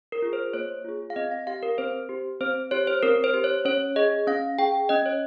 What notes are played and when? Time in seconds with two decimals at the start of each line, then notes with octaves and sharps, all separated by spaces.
0.12 A#4
0.22 F4 G#4
0.33 C5
0.53 A#3 C#5
0.84 F4 G#4
1.10 F5
1.16 C4 D#5
1.31 F5
1.47 G4 F5
1.63 A#4
1.78 C4 C5
2.09 G4
2.40 C4 C5
2.71 G4 C#5
2.87 C5
3.03 C4 A#4
3.24 C5
3.34 G4
3.44 C#5
3.65 C#4 C#5
3.96 G#4 D#5
4.27 C#4 F5
4.59 G#4 G5
4.89 C#4 D#5
5.06 C#5